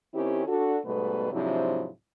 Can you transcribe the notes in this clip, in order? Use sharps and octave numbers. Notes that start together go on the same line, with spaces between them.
D#3 C4 C#4 E4 G4
D4 F#4 A4
G#2 B2 G3 A3 B3 B4
G#2 C3 F3 F#3 D4 E4